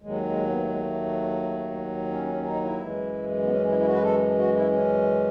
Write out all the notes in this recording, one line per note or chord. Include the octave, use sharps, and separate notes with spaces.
D#2 D#3 F#3 G#3
G#3
B3
A3
G#3
A3
C#4
C#4
D#4
E4
F#2 E3 G#3
B3
C#4
E4
E4
F#4
B4
A4
F#4
E4
C#4